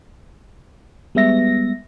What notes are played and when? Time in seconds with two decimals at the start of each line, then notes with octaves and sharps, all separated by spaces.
1.15 G3 G#3 B3 E5 A#6